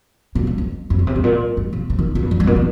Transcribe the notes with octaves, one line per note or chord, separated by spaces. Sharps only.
A#2
G2
F2
F2
A#2
C3
G2
A#2
G2
A#2
C3
D#3
A#2
G2
F2
G2
A#2
D#3